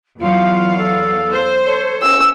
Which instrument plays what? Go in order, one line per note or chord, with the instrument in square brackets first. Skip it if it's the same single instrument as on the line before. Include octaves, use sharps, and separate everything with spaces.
[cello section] E2 F#3 F5 [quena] F4
[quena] A4
[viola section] C5
[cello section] A4 [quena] C#5
[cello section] C#4 [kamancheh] E6